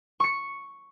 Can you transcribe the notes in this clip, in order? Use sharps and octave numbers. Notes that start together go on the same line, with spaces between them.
C#6 C#7